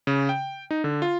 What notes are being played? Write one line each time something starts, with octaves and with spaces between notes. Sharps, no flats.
C#3
G5
D#4
D3
F4